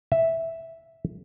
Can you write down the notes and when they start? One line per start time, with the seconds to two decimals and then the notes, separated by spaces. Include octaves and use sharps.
0.12 E5